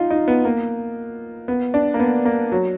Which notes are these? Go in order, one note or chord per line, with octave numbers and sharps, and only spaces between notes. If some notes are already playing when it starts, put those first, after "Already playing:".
Already playing: D#4 F4
D#4
B3
A#3
B3
D4
A#3
B3
A#3
F#3